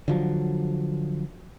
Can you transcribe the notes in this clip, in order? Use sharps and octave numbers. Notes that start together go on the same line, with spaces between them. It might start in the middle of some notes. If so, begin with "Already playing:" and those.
D3 F3 F#3